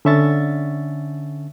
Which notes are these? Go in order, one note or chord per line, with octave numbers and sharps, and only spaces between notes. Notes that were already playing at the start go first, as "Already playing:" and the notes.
D3 C#4 E5 C#6 A6